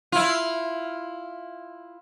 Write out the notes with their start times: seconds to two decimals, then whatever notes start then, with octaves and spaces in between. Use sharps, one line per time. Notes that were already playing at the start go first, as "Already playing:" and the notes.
0.12 E4 F4